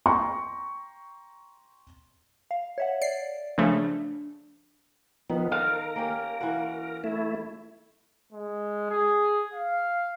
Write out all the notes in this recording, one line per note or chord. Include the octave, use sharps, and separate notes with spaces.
G5 A#5 C6 C#6
F5
C#5 E5 F#5
D5 C7
C#3 F3 A3 D4
D#3 F3 B3
A4 A#4 F5
A#3 C#4 G4
E3 F#4
A3 E4
G#3
G#4
F5